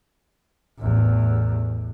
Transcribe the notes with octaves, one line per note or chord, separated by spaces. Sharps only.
A1 E2